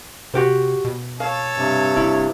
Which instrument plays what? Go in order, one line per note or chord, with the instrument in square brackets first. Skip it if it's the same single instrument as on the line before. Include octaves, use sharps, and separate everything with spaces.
[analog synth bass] C3 [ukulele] F#4 G4 C5
[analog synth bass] B2
[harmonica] A4 C#5 [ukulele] F5
[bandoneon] G2 C3
[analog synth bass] E1 [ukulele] E4